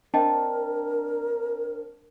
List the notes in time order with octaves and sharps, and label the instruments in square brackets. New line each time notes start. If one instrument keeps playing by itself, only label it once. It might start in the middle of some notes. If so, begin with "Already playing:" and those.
[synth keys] C4 D4 [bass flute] A#4 [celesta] D#5 G5 A5